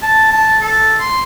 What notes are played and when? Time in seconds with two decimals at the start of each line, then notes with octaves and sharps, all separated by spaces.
0.02 A5
0.31 A5
0.61 A4
1.00 C6